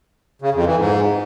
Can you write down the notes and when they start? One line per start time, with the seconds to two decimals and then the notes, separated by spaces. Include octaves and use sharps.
0.42 C#3
0.54 F2
0.66 E3
0.78 G#2